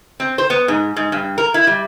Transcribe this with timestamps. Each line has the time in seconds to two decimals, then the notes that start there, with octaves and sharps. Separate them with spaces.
0.20 C4
0.38 C5
0.50 B3
0.68 G#2
0.96 G#2
1.12 G2
1.38 A#4
1.54 E4
1.67 G3